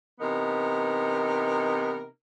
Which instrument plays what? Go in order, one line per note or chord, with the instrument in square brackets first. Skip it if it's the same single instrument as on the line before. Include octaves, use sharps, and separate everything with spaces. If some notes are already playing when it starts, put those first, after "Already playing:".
[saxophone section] C3 E3 B3 D#4 A#4